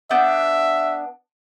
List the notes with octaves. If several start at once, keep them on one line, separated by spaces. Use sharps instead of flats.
B3 D4 E5 G6